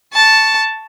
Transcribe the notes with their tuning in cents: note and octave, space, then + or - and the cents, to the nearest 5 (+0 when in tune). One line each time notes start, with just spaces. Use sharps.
A5 +0 C#6 +5